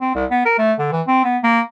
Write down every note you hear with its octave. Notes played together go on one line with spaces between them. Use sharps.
C4
C2
B3
A#4
A3
D3
E3
C4
B3
A#3